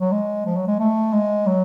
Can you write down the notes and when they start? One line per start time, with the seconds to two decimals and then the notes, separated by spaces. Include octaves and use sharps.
0.01 F#3
0.12 G#3
0.46 F3
0.56 F#3
0.68 G#3
0.79 A3
1.13 G#3
1.46 F#3